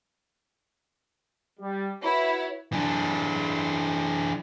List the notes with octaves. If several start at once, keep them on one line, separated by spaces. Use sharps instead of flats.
G3
E4 F#4 B4 C#5
E3 D4